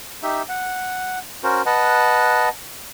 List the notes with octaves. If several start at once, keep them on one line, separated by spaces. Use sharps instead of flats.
D#4 G4 E5
F#5
C#4 F#4 A#4 C5
B4 D#5 F#5 A5